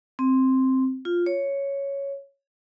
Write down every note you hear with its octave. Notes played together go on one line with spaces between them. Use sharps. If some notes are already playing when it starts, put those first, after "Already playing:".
C4
F4
C#5